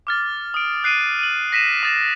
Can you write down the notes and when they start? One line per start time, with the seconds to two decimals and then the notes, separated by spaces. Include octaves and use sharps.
0.07 D6 F6 A6
0.54 D#6 D7
0.84 F#6 C7 D7 D#7
1.19 D#7 F#7
1.52 A#6 B6 D#7 E7
1.83 D#6 A6 E7